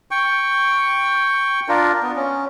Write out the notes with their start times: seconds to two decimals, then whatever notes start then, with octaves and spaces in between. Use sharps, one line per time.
0.11 G5 C#6
1.68 D4 F4 A#4
2.03 B3
2.16 C#4